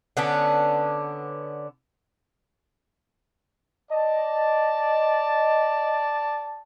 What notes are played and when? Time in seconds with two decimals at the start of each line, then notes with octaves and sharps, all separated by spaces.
0.17 D3 B3 C#4 D4
3.90 D5 D#5 A5